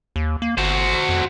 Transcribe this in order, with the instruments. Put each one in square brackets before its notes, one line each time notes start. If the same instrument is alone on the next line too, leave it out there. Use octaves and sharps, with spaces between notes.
[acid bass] D#2
A#3
[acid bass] G1 [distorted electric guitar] F#4 C5
[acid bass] F2